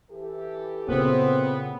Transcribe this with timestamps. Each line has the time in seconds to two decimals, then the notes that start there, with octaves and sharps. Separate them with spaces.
0.11 E3 G4 A4
0.89 A#2 C#3 B3 C4